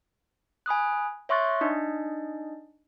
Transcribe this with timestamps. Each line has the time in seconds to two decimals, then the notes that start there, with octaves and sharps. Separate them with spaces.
0.66 G#5 B5 D#6 F#6
1.29 C#5 E5 C6 C#6 F#6 A6
1.61 D4 D#4 D#5